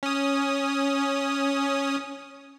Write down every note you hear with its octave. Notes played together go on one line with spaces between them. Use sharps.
C#4 D#6